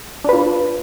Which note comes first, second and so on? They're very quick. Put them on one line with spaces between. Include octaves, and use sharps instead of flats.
D4 B4 F4